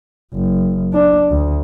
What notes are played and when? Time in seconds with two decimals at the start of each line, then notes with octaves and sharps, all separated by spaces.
0.34 F#1
0.93 D4
1.31 D2